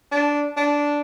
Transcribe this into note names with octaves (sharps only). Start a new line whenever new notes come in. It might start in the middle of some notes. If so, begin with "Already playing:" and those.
D4
D4